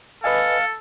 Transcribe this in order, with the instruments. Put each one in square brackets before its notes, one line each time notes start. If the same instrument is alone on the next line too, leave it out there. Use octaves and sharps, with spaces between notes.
[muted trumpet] A4 [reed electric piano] B4 D#5 G#5 [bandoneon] F5